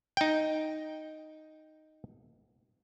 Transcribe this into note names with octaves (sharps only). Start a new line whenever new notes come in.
D#4 G5